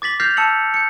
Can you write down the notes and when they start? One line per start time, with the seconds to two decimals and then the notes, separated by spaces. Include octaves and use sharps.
0.02 D6 A6 B6 F#7
0.20 F6 G6 A#6 C7 F7
0.37 A5 E6 C#7 F#7
0.74 G6 C#7